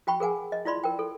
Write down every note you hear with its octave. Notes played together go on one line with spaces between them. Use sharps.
F#4 G5 B5 C#6
G#4 A#4 F#5 G#5
D#5
E4 F4 D5 B5 C6
A#4 G5
A4